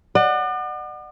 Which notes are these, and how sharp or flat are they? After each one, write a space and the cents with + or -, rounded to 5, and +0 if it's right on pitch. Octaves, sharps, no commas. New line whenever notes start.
D5 +45 F#5 +0